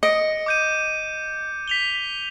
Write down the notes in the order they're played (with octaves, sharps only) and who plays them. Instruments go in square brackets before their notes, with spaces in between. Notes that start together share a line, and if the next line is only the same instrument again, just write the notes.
[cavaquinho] D#5 [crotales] C#7 D7
[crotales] D6 G6 D#7
B6 F7 G7